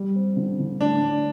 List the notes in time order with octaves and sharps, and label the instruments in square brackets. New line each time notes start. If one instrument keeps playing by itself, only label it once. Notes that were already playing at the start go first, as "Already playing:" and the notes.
Already playing: [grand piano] G3
C4
D3
D3
[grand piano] A2 [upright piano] D4
[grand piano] A2